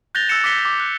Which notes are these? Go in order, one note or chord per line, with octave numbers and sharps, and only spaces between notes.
F#6 G6 A6 A#6 F7 G7
E6 F#6 A6 C#7 E7
D6 A#6 B6 C#7 G7
D6
F#6